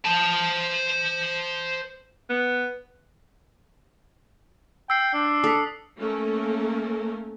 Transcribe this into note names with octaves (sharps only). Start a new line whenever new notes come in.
C5 A5
B3
G5 E6 C7
D4
A4 D#6 B6
A3 A#3 C#4 A4 A#4